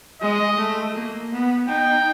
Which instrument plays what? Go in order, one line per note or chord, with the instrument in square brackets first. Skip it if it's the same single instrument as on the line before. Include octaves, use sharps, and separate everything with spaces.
[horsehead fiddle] G#3 [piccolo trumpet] D#5
[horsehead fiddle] A3
A#3
B3
[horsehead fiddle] D#4 [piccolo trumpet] G5